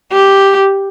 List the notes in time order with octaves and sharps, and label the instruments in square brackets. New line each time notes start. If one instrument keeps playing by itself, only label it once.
[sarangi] G4